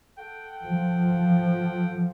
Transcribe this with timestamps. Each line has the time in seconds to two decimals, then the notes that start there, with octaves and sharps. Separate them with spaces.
0.18 A4 F#5 G5
0.65 F3